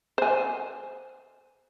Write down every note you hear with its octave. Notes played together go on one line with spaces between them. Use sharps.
C5 G#5